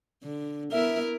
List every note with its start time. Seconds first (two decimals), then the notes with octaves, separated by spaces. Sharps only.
0.23 D3
0.72 B3 E4 A#4 E5